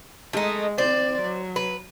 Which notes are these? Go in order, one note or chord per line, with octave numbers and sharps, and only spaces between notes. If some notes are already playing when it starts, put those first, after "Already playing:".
G#3 A3 D#4
C4 C5 D5
F#3
B4